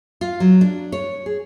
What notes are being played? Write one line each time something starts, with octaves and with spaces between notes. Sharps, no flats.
F4
F#3
D4
C#5
G#4